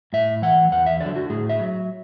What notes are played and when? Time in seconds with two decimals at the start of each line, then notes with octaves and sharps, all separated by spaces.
0.13 A2 E5
0.42 E3 F#5
0.72 E2 F#5
0.86 E5
1.01 D3 F#3 D5
1.16 F#4
1.30 A2 G#4
1.49 E5
1.60 F#3